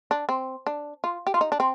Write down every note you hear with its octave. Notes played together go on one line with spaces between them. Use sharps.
D4
C4
D4
F4
G4
F4
D#4
D4
C4